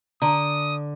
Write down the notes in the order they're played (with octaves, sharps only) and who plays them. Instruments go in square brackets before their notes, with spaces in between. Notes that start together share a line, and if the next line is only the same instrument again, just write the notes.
[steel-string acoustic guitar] D3 [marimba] A#5 [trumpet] D#6